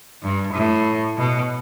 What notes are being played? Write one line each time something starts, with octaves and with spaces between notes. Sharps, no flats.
G2
A2
B2